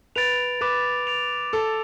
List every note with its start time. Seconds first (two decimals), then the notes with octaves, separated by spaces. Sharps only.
0.16 B4 A6 D7 F7
0.61 B4 D6
1.07 A6 D7 F7
1.53 A4 D6